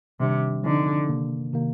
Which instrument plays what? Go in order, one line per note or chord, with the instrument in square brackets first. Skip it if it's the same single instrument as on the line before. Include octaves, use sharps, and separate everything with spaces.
[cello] C3 [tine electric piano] D#3 G3 D4
[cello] D3 [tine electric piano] F3 C4 D#4
[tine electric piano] C3 D#3 A#3
C3 D#3 A#3